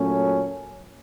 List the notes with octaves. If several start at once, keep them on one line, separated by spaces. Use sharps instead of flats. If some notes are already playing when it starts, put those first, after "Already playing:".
Already playing: A#2 F#3 A3 C#4